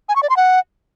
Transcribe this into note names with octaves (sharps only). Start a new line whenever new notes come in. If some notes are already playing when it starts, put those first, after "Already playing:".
G#5
C#6
D5
C6
F#5